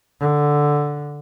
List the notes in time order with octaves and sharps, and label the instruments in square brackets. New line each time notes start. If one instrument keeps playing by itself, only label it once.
[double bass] D3